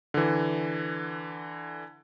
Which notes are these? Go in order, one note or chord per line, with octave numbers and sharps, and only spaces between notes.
D3 E3